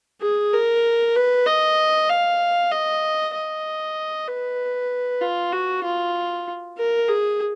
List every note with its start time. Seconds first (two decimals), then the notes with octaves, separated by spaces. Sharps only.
0.21 G#4
0.53 A#4
1.15 B4
1.46 D#5
2.09 F5
2.71 D#5
3.34 D#5
4.27 B4
5.21 F4
5.52 F#4
5.84 F4
6.77 A#4
7.09 G#4